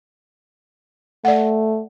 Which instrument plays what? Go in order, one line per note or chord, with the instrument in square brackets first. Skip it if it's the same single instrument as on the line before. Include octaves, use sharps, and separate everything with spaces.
[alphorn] A3 [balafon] D5 F#5